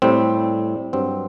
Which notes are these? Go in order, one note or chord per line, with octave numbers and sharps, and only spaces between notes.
A2 G3 C4
G2 F#3 C4